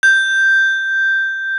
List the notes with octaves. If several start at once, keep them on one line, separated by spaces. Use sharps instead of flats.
G6